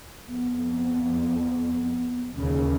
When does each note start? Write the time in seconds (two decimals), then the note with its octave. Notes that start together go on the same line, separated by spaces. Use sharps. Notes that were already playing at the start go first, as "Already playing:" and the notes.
0.28 F2 B3
2.36 D#2 C#3 C#4